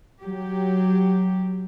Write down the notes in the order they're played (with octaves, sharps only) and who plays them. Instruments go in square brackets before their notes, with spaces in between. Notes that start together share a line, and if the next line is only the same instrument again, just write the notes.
[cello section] F#3 G4